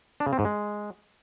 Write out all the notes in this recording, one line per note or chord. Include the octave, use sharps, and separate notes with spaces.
D4
C#3
C4
G#2
G#3